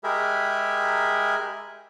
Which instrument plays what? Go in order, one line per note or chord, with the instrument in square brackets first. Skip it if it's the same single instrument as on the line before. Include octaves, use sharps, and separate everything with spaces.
[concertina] G#3 G4 G#4 A#4 E5 B5